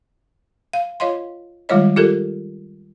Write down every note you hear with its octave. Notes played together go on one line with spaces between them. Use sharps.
F5
F4 C#5 D#5 F5 C6
D#3 G3 G#3 F4 C#5 D#5
F4 G4 A4 A#4